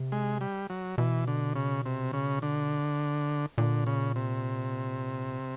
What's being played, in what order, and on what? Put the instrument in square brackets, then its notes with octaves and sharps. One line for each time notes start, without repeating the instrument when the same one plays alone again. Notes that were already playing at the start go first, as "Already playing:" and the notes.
Already playing: [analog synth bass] C3
[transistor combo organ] G#3
G3
F#3
[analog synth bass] B2 [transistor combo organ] E3
[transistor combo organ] D3
C#3
C3
C#3
D3
[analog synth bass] A#2 [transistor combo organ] D3
[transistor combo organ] C#3
C3